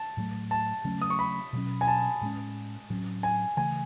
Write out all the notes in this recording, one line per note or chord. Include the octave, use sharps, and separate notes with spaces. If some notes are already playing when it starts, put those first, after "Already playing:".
Already playing: A5
A2 F#3 A3
A5
C#3 F#3 A3 C#4
D#6
C#6
B5
B2 F#3 C#4
G#5
A5
A2 G#3 C#4
A2 F#3 C#4
G#5
C#3 E3 A3 G#5